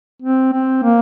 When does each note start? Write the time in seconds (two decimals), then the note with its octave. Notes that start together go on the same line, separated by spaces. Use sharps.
0.22 C4
0.52 C4
0.83 A#3